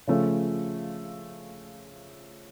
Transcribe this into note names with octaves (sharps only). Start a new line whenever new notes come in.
C#3 F3 A3 C#4